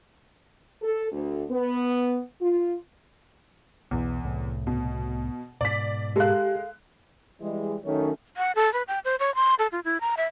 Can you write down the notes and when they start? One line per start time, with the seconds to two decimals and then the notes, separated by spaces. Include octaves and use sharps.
0.82 A4
1.12 D2
1.50 B3
2.41 F4
3.91 B1 E2 B2
4.24 C2 A2
4.67 B2
5.61 G#2 B2 D5 B6
6.16 G#3 G4 A4 A#4 F5 F#6
7.40 E3 G3 G#3
7.85 F#2 D#3 A3 C#4
8.37 F#5
8.55 A4
8.74 B4
8.88 G5
9.05 C5
9.19 C#5
9.35 C6
9.59 A4
9.72 F4
9.84 E4
10.01 A#5
10.17 E5